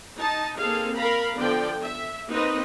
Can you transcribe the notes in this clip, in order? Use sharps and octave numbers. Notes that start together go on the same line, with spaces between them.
D#4 A5
A#3 C4 G#4 A4 F5
A#4 F5 A#5 B5
D3 F3 B3 D5 G5
E5
A#3 C4 D#4 B4 D#5